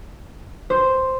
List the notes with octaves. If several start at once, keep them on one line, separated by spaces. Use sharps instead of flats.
C5